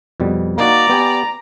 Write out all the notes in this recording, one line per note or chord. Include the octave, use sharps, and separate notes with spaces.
F2 B2 G3
A#3 D#4 F#4 D5 A#5
B3 G4 G#5